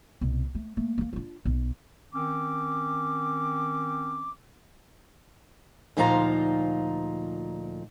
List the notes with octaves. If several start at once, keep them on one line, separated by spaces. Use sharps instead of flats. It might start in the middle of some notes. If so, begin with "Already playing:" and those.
C2 B2
A3
A3 A#3
A3 A#3
D4 F4
B1
D#3 C4 C#4 D6
D2 A#2 F3 D#4 F5 A#5